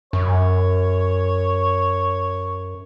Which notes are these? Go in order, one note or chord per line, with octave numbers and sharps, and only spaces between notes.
F#2 C#5